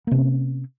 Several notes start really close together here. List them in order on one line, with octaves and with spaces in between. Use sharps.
A#3 C3 C#4